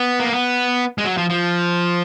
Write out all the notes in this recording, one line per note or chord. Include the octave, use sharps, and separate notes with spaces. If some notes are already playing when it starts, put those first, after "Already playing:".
Already playing: B3
A#3
B3
G#3
F#3
F3
F3